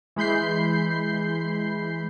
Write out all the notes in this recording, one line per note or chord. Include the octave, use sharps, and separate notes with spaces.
E3 G#3 B5 G6 C7